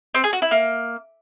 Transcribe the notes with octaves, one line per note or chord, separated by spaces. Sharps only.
C4
G#4
F#4
E4
A#3